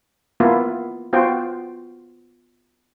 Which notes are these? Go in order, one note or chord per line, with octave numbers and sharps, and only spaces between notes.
A#3 B3 E4 F4
B3 F4 F#4 C5 G5